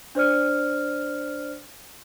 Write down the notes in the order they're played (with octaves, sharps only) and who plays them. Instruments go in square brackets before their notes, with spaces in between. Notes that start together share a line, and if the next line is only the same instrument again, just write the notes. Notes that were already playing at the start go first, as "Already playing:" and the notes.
[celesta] D4 C5 D5 F6